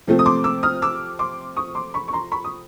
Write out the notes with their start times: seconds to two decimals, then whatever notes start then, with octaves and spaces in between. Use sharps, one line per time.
0.07 C3 F3 A3 C4
0.19 D#6
0.26 C6 D6
0.44 D6 E6
0.63 D#6 F6
0.82 D6 E6
1.19 C6 D6
1.56 C#6 D#6
1.75 C6 D6
1.94 B5 C#6
2.08 C#6
2.13 A#5 C6
2.32 B5 C#6
2.44 D#6